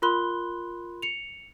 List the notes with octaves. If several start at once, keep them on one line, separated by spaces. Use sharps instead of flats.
F4 A#4 B5 C6 F#6 G7
C#7 F7